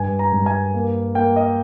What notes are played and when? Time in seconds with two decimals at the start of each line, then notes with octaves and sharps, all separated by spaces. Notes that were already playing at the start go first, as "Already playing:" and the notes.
Already playing: G2 G#5
0.19 A#5
0.33 G2
0.46 G#5
0.74 A#3
1.15 A#3 G5
1.36 D#5